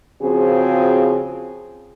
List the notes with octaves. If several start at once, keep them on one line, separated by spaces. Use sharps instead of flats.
C#3 F3 C4 F4 F#4 G#4